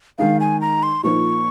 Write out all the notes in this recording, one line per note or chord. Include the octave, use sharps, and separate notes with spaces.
D#3 G#3 D#4 F5
G#5
A#5
C6
A#2 F3 A#3 D#4 C#6